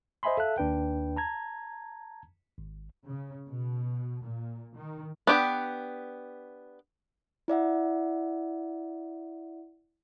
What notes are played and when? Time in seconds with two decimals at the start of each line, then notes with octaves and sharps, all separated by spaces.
0.23 C5 D#5 E5 G#5 B5 C6
0.37 A4 E5 F5 A5 F#6
0.58 D#2 D4 B4 G5
1.17 A5 A#5 G#6
2.58 G#1
3.06 C#3
3.48 B2
4.23 A#2
4.77 D#3
5.27 B3 D4 G4 G5
7.48 E4 D5 E5 F#5